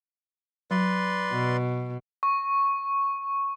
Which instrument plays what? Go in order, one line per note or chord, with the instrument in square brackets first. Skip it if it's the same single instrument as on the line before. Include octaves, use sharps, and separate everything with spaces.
[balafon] F#3 [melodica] B4 D5 C6
[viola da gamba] B2
[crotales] C#6